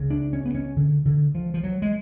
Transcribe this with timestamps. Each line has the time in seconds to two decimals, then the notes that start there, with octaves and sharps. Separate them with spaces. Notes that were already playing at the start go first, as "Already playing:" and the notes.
Already playing: C#2 C#3
0.10 D4
0.33 C#4
0.46 B3
0.55 C#4
0.76 D3
1.05 D3
1.35 F3
1.54 F3
1.63 F#3
1.82 G#3